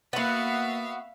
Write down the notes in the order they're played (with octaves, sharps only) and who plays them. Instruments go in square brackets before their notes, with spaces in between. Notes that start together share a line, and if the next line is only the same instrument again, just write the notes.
[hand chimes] A#3 A6 [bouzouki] B3 F#4 [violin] E5 F5